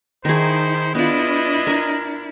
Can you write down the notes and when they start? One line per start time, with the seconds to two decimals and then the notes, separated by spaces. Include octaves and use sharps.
0.25 D#3 D#4 E4 G#4 C5
0.95 B3 D4 E4 F4 D#5
1.67 A#4 G#5